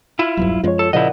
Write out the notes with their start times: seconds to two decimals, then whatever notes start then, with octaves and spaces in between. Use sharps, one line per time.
0.19 E4 F4
0.37 E1 B1 G2 F#3
0.64 F#2 F3 G#3 F4 C#5
0.79 A4
0.93 A#2 C#3 F3 E4 A#4 D5 D#5 F#5